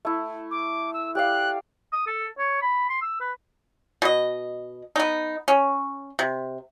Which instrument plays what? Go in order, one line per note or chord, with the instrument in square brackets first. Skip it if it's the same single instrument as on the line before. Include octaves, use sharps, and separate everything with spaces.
[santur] A3 E4
[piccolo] D6
E6
[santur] G4 D5 F5 [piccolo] F#6
[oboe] D#6
A4
C#5
B5
C6
E6
B4
[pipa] B2 D#5
B3 D#4
C#4
C3